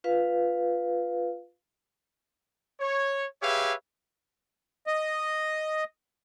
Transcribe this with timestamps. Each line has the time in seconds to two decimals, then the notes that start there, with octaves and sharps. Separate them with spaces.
0.04 F4 B4 F5
2.81 C#5
3.42 G4 G#4 B4 C#5 E5 F5
4.87 D#5